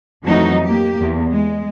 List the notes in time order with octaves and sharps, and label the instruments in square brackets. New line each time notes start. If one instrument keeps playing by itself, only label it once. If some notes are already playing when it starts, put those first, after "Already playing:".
[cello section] F2 E3 F#3 A3 D#4 F#4
A#3 G4
E2
G#3